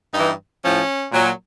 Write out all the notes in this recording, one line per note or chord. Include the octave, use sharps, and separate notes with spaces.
G2 E3 D#4
A2 F3 C#4
A#2 F#3